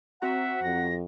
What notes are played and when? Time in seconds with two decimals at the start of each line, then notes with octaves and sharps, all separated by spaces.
0.22 C4 F#4 E5 F#5 A#5
0.63 F2 A#6